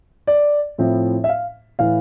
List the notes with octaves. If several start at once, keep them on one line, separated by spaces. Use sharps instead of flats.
D5
A2 F3 C4 E4
E5
F5
A2 E3 F5